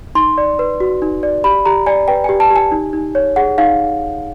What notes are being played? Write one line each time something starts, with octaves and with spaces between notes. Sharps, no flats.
D#4 C6
D5
B4
F#4
D#4
D5
G4 B5
G4 A#5
D5 G#5
B4 G5
G4 G#5
A5
G4
G#5
D#4
D#4
C#5
G#4 F#5
D#4 F5